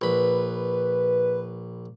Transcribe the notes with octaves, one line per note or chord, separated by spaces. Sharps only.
A#1 B4 B5